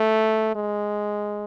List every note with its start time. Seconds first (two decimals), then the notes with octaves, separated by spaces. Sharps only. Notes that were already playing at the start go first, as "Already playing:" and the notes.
Already playing: A3
0.55 G#3